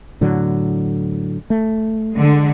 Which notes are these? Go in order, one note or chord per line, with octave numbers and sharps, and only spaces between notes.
A2 D3 F#3
A3
D3 G#3